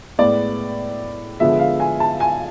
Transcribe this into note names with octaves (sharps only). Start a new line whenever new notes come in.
A2 G#3 B3 D5
D3 F3 G#3 B3 E5
F5
G#5
A5
G#5